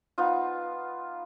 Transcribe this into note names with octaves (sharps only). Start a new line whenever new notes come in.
B3 D#4 F4